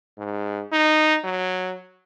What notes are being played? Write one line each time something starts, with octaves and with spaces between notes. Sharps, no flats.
G#2
D#4
F#3